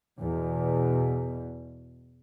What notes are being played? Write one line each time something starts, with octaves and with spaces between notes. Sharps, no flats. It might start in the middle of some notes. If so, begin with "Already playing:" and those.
E2 B2